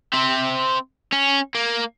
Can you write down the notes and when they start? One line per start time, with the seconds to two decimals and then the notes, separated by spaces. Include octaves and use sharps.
0.13 C4 E5
1.12 C#4
1.55 A#3